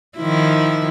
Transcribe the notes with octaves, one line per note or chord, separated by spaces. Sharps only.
D#3 F3 E4